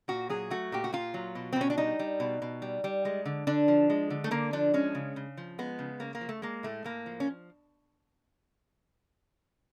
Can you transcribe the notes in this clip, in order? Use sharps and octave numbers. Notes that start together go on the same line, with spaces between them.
A#2 F#4
F#3 G#4
A3 F#4
A#2 G4
F#4
A#2 F4
F#3
B2
C4
B2 C#4
D4
G3 D#4
G3
B2
B2
G3
G3
G#3
D3
D3 D4
F3
G#3
D3
A3
D3 A#3
F3 D4
G#3 C#4
C#3
C#3
F3
G#3 B3
C#3
C#3 A#3
A#3
F3
A3
G#3 A#3
A2 A3
A2 A#3
F3
C#4